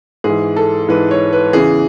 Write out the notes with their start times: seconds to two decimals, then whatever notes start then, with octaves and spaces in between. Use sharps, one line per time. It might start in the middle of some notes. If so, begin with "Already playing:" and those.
0.24 G#2 E3 G#4
0.56 A4
0.88 G#2 E3 B4
1.11 C#5
1.33 B4
1.53 E2 C#3 E3 G#4